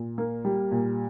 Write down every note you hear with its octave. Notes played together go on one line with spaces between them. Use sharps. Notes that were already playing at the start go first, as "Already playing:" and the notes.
Already playing: A#2
A#3
G3
A#2